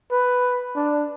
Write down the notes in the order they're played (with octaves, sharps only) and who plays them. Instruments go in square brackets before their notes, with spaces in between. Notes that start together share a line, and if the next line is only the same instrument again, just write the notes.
[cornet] B4
D4